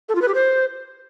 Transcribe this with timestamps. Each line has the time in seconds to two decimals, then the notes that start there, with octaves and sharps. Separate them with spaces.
0.09 A4
0.15 F4
0.22 B4
0.28 G4
0.35 C5